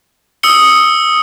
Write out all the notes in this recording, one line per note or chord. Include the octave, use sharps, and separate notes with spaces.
D#6 E6 C#7 G7